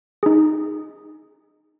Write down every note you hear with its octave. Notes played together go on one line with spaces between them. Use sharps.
D#4 G#4